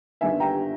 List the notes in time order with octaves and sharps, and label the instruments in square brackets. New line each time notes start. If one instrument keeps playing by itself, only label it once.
[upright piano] G1 G2 D#3 E5 G#5
G5 A#5